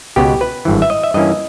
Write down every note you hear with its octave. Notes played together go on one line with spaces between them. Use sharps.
C#2 B2 G#3 B3 G4
B4
G#1 G2 E3
E5
D#5
E5
G2 E3 A#3 C#4 D#5